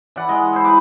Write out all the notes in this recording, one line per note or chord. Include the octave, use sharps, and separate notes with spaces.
E3 D5 F#5
G#3 D#5
E4 C5
D#4 B4 D6